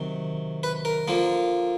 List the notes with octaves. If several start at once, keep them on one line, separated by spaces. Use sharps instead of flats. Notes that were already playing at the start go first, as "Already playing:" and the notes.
Already playing: C3 D#3 F#3
B4
A#4
D3 F3 A#3